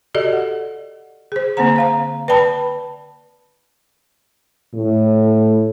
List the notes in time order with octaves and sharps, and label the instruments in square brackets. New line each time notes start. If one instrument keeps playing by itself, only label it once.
[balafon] F#4 G4 A4 D5 D#5
F#5
G#4 C5
D3 A#3 C4 C5 F#5 A#5
C5 F5 A#5
B4 D5 G5 A5 B5
[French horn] A2